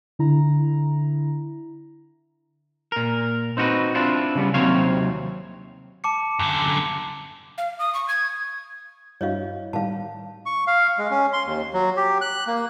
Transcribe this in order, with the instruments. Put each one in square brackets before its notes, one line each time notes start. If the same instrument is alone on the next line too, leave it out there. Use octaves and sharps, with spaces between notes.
[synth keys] D3 E4 A#5
[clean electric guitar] A#2 A#4
C4 D#4 F#4 A#4 B4
C4 D4 E4 F4
C#3 G3 B3
D#2 C3 F#3 C4 C#5 F5
[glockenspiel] A5 D6 C#7
[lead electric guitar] F#2 D3
[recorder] F5
D#6
C#6
G#6
[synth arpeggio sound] G2 E4 F#4 [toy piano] C#5 D#5 F5
[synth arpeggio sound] A2 D#3 G3 [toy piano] F5 A5
[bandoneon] C#6
F5
G#3
C#4
C6
D#2
F#3
G4
F#6
A#3